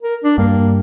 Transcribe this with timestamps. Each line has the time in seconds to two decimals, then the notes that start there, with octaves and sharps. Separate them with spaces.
0.02 A#4
0.24 D4
0.38 G2 A#3